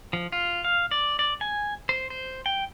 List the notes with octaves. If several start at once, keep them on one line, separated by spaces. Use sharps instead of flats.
F3
F4
F5
D5
D5
G#5
C5
C5
G5